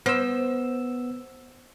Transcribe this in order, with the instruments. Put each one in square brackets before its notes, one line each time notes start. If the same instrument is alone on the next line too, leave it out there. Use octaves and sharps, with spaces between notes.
[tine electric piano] B3 E6 [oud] C5